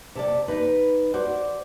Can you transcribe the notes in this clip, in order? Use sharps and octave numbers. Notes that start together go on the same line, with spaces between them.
C3 A4 D5
D#4 B4
F#4 C5 D5